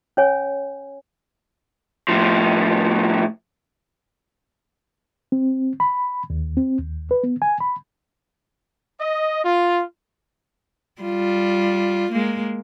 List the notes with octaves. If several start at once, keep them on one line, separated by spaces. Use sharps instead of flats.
C#4 C#5 G#5
A2 F3
C4
B5
D#2
C4
D#2
B4
B3
G#5
B5
D#5
F4
G3 F4
G#3 A#3